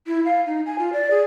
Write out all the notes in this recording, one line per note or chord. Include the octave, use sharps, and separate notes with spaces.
E4
F5
D#4
G#5
F4
D5
G#4